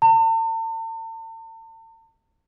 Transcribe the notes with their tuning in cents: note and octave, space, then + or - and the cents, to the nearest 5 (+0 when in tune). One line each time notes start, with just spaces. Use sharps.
A5 +40